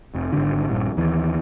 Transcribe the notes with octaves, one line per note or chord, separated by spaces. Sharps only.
F1
G#1 D3
A#1 G2
D#2 E3